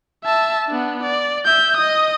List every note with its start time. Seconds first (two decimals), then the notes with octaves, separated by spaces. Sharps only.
0.24 E5 A5
0.67 B3 D4
1.03 D5
1.46 E5 G6
1.77 D#5 D#6